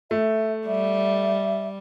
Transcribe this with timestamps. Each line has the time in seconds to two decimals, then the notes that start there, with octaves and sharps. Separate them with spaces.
0.11 A3 E5
0.67 G3 E5